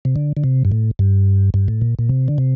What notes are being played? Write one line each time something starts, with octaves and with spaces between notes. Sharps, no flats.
C3
D3
D3
C3
G2
A2
G2
G2
A2
A#2
A#2
C3
D3
C3